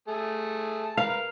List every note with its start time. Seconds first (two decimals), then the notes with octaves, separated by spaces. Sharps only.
0.08 A3 G#4 A5
0.97 A#4 B4 F5